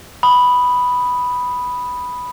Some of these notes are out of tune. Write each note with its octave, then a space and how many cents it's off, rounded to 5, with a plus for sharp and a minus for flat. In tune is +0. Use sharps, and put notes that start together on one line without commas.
B5 +0 D#6 +0